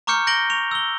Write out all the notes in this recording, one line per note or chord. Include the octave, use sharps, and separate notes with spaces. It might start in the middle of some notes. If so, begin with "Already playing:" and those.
A#5 C#6 D6 F6 G6 C#7
G6 A#6 D7 F#7 G7
C#6 F7
E6 G7